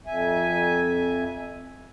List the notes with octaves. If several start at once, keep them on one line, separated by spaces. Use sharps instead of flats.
F2 E5 G#5